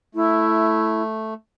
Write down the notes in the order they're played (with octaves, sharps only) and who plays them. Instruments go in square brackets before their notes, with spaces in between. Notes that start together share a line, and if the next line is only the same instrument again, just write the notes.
[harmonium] A3 [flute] E4